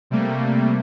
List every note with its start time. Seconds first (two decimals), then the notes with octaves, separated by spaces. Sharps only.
0.10 C3 G3 A3 A#3